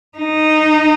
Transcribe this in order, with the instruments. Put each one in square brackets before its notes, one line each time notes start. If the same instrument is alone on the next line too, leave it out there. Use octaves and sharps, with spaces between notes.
[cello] D#4